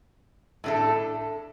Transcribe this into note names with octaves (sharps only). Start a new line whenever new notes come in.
A2 A3 D4 A4